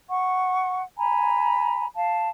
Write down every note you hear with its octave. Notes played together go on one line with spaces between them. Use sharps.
F#5 C#6
G#5 A#5 B5
F5 A5